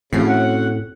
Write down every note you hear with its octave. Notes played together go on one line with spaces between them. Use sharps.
A2 C#3 C4 C#4 F#4
F#5